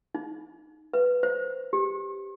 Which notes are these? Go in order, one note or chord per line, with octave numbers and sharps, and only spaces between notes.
D#4
B4
C5
G4